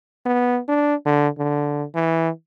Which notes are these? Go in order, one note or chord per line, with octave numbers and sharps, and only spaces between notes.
B3
D4
D3
D3
E3